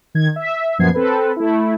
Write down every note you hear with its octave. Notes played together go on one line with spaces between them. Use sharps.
D#3 G#6
E5
F#2 A#2 F3 B3 G#6 C7
C4 A4 B4
A3 E4